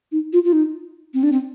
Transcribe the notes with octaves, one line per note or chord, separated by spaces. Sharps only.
D#4
F4
F4
D#4
C4
D4
C4